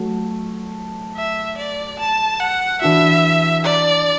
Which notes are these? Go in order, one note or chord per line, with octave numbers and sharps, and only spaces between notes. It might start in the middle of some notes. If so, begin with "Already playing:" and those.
Already playing: F#3 A3 F#4
E5
D5
A5
F#5
E3 D4 F#4 E5
D5